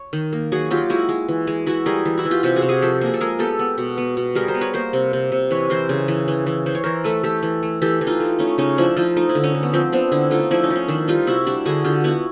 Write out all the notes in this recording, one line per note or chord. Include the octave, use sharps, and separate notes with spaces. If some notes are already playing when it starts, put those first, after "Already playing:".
Already playing: C#5
D#3
A#3
F#3 F#4 G#4
F#3 F4 G4
G#3 E4 F#4
G#3
E3
G#3
E3 E4 F#4
G3 G#4 A#4
E3
E4 F#4
E3
F4 G4
C3 F4 G4
F#4 G#4
C3
F#4 G#4
F3 G4 A4
A#3 G#4
A4
G#3 G#4 A#4
B3 G4 A4
B3
B2
B3
B2
G3 G#4 A#4
A#4 C5
B3
B4 C#5
A#3 A#4 C5
C3
C3
C3
E3 B4 C#5
E3 A#4 C5
C#3
E3
E3
E3
E3 C5
C#5
E3 A#4 C5
A3 A4 B4
A3 G4 A4
E3
A3
E3 G4 A4
E3
D#4 F4
A3
A3 C#4 D#4
C#3 C#4 D#4
F3 D4 E4
F3 D#4 F4
A3 D#4
E4
D3
C#4 D#4
D3
B3
F3 C4
B3 C4 D4
D3 D4 E4
A3 D#4 F4
F3 D4 E4
C#4 D#4
F3
C#4 D#4
D#3 D4 E4
G3 D#4 F4
C3 E4 F#4
G3 D4 E4
D3 F#4 G#4
D3 F4 G4
B3 E4 F#4